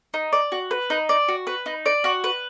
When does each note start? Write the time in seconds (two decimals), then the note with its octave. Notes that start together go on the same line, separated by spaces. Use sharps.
0.14 D#4
0.33 D5
0.52 F#4
0.71 B4
0.90 D#4
1.09 D5
1.28 F#4
1.47 B4
1.66 D#4
1.86 D5
2.04 F#4
2.24 B4